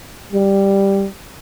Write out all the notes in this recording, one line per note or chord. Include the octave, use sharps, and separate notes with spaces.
G3